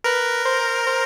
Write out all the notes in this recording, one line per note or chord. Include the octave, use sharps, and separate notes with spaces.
A#4 B4
C5
C5